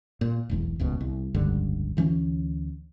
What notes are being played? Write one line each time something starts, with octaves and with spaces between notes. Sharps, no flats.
A#2
E1 B1 E2
D#1 C#2 B2
C2
F1 C#2 G2 D3
D2 E3 A3 C#4